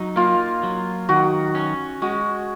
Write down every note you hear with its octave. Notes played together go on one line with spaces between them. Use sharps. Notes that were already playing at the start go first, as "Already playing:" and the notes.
Already playing: F#3 D#4
A#3 F4
F#3
D#3 F#4
C#4
G#3 F#4